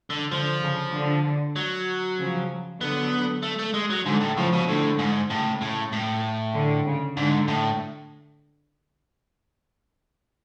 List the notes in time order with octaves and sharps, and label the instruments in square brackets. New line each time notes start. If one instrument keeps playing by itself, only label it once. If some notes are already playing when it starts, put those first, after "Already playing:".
[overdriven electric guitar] D3
[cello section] D3 [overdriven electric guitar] F3
[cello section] C#3
D3
[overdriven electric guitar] F#3
[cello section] C#3 F3
[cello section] D3 F#3 [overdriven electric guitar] B3
[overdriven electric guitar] A3
A3
G#3
F#3
[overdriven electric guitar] G#2 [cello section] D3
[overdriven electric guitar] A2
[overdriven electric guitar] A2 [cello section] C#3 F3
[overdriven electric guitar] B2
[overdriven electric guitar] A2 [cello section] D3
[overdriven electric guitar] G#2
[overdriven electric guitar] A2 [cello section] C#3
[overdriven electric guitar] A2
A2
[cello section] D3
C#3
[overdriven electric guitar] G#2 [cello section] D3
[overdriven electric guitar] A2